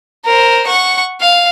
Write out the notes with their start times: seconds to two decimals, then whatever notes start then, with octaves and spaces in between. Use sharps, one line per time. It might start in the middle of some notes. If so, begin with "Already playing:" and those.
0.25 A#4 C5
0.66 F#5 C#6
1.21 F5